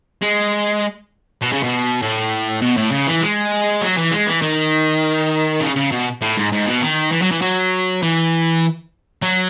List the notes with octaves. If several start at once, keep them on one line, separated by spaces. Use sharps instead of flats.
G#3
B2
C#3
B2
A2
B2
A2
C#3
E3
G#3
F#3
E3
G#3
E3
D#3
C#3
C#3
B2
A2
G#2
G#2
B2
D#3
E3
F#3
E3
F#3
E3
F#3